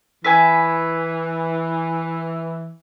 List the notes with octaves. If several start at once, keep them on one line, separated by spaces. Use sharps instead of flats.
E3 B4 E5 G#5